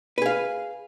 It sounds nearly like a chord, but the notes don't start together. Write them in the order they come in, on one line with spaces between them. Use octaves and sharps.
B4 G#4 F5